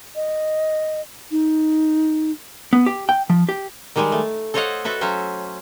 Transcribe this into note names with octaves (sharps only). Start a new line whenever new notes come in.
D#5
D#4
B3
G4
G5
F3
G4
D#3 G3 G#3 G#4 G#5
A3
A4 C5 C#5 D#5 F5 F#5
F#4 A4 B4 E5
F#3 C#4 C5 E5